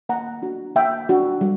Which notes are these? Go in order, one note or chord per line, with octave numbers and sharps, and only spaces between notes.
A#3 F#5 A#5
D4 F#4
A#3 E5 G5
D4 F#4
G3